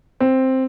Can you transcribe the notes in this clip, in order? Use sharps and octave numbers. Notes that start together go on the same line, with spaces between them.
C4